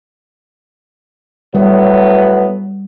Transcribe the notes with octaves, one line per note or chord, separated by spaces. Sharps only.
A2 F#3 G3 B3